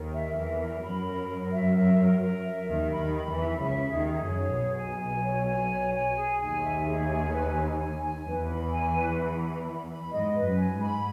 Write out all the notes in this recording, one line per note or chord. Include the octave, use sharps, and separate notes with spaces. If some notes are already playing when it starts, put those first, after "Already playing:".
Already playing: D#2 D#3 A#4
E5
E2 E3 A#4
A#4
F#2 F#3 B5
A#4
A#4
E5
A#4
A#4
A#4
E5
D#2 D#3 A#4
B5
D#2 D#3
B5
E2 E3
E5
C#2 C#3 E5
G#4
D#2 D#3
G#4
F#2 F#3
C#5
B1 B2 G#4
G#5
G#5
C#5
G#5
C#5
G#5
G#4
D#2 D#3 G#5
E5
G#4
G#5
B4
G#5
G#5
G#5
E2 E3 B4
B5
G#5
B4
B5
B5
B5
B5
G#2 D#5
B4
F#2
G#5
G#2
B5